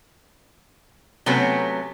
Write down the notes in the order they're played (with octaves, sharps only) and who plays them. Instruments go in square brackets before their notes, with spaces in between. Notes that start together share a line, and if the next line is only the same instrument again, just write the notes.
[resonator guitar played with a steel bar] C3 F#3 A3 B3 C#4